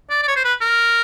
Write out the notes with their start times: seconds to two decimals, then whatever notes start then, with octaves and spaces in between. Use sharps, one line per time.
0.10 D5
0.23 D5
0.28 C#5
0.36 C5
0.45 B4
0.61 A#4